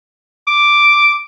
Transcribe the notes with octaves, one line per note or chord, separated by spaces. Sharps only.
D6